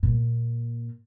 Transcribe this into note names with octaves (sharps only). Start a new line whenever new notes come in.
A#2